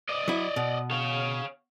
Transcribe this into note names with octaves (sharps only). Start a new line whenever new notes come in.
D5 D#5
F#3 E4
B2
C#5 F5